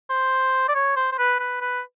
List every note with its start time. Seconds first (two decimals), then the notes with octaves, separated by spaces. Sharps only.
0.10 C5
0.68 D5
0.75 C#5
0.96 C5
1.12 C5
1.18 B4
1.39 B4
1.61 B4